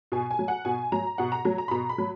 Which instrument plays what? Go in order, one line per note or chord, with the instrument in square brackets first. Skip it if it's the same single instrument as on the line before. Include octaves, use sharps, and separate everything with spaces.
[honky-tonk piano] B2 G#5
G#5
F#3
F#5
B2 G#5
F#3 A#5
B2 F#5
A#5
F#3 A#5
A#5
B5
B2 A#5
B5
F#3